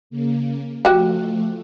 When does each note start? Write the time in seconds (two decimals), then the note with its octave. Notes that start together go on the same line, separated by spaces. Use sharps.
0.10 C#3 A#3
0.85 F3 A3 F#4 G4